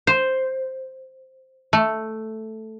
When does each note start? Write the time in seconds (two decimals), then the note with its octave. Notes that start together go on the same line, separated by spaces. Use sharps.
0.07 C5
1.73 A3